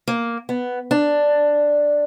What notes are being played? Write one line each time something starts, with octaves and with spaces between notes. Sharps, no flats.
A#3
B3
D4